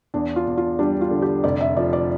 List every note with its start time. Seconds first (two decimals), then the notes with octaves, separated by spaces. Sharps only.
0.14 E2 D4
0.36 F4
0.47 E2
0.57 F4
0.79 G3 D4
1.01 F4
1.11 D3
1.22 G4
1.44 F1 D5
1.61 E5
1.77 F3 D5
1.93 D5